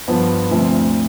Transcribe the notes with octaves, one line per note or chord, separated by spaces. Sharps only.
G2 F3 B3
D2 C3 F3